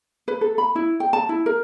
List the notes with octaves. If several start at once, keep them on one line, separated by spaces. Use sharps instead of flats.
B4
A4
B5
E4
G5
A5
E4
A#4